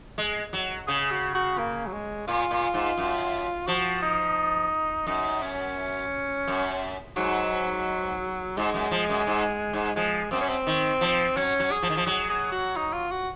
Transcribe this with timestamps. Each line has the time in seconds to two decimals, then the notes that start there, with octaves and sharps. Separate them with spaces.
0.18 G#3
0.53 F#3
0.87 C#3 G#4
1.11 F#4
1.35 F#4
1.58 A#3
1.87 F#3
1.93 G#3
2.27 A#2 F4
2.51 A#2
2.74 G#2
2.98 F#2
3.67 F3 F#4
4.02 D#4
5.07 F#2 D#4
5.42 C#4
6.48 F#2
7.16 G#2 F#3
8.57 G#2 G#3
8.74 F#2
8.91 F3
9.09 F#2
9.27 G#2
9.73 G#2
9.96 F3 G#3
10.31 F#2 C4
10.41 C#4
10.49 C4
10.67 D#3
11.01 F3
11.36 F#3 C#4
11.60 F#3
11.71 G#4
11.82 F3
11.90 D#3
11.97 F3
12.06 F#3 G#4
12.30 G#4
12.52 F#4
12.76 D#4
12.93 F4
13.11 F#4